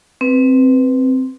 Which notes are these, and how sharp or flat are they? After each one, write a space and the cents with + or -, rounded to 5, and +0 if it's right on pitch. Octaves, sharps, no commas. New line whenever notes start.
C4 +0 B4 +5